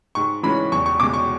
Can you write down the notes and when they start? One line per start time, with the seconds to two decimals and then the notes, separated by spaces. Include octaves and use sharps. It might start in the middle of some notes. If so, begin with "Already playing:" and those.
0.15 G#2 C#6
0.43 E3 G#3 C#4 B5
0.72 E2 C#6
0.86 C#6
1.00 B2 G#3 D6
1.14 C#6